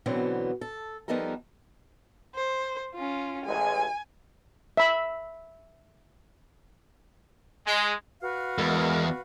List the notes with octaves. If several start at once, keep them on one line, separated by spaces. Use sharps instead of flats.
B2 D3 E3 F#3 B3 C4
A4
F3 G3 B3 D#4 A4 A#4
C5
C#4 F4
A1 G#3 G#5
E5 B5
G#3
F#4 B4 F5
E2 G#3 A#4